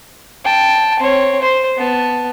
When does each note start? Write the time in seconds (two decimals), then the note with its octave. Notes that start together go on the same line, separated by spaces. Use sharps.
0.45 G5 A5
1.00 C4 C#5
1.42 C5
1.78 B3 A5